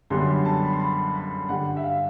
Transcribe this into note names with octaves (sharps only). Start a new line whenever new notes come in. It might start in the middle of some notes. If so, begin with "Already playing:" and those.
F#2 D3 G3 B3 C6
B5
A5
B5
C6
B5
B5
G2 D3 G3 F#5
E5
F5